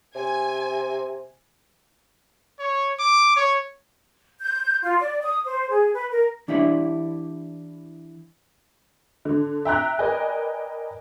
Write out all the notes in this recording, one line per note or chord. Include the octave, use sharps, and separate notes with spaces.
C3 G#5
C#5
D6
C#5
G6
F4
D5
D#6
C5
G#4
B4
A#4
E3 D4 E4 G4 D5 E5
D3
E5 G5 A#5 F#6
A#4 B4 D5 D#5 G5 G#5